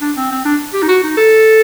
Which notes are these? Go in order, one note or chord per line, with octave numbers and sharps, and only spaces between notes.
D4
C4
C4
D4
G4
D#4
F#4
D#4
A4